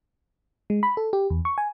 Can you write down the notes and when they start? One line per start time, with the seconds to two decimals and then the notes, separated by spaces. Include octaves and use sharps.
0.70 G#3
0.83 B5
0.97 A4
1.13 G4
1.30 E2
1.45 C#6
1.58 G#5